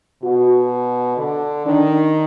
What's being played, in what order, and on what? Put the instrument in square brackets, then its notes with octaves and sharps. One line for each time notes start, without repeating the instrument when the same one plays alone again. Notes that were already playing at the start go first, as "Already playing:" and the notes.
[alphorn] B2 [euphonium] F#4
[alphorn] D3
[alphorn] D#3 [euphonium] D4